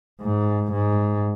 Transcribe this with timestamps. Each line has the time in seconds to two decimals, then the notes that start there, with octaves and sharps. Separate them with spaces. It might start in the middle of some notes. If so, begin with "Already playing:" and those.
0.21 G#2
0.72 G#2